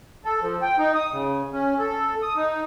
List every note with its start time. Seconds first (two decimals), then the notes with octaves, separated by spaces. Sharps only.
0.25 A4
0.42 F3
0.62 G5
0.78 D#4
0.95 D#6
1.12 C#3
1.53 C#4
1.78 A4
2.22 D#6
2.36 D#4